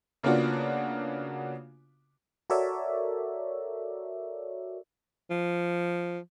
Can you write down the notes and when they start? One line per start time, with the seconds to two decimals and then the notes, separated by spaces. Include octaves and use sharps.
0.23 C#3 A#3 B3 D4 F4 F#4
2.50 F#4 A4 A#4 C#5 D5 E5
5.31 F3